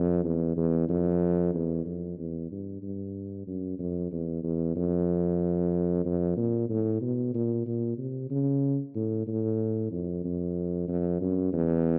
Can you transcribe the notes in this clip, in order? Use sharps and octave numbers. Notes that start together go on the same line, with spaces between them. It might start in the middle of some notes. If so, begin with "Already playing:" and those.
Already playing: F2
E2
E2
F2
E2
F2
E2
G2
G2
F#2
F2
E2
E2
F2
F2
A#2
A2
B2
A#2
A#2
C3
C#3
A2
A2
F2
F2
F2
F#2
E2